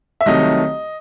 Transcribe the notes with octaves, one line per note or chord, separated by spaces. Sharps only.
E5
C2 C3 D#3 F#3 A3 D#5